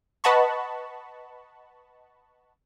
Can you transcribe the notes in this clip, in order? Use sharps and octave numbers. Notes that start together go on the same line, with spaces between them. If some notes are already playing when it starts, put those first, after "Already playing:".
B4 D#5 F#5 A5 B5 C#6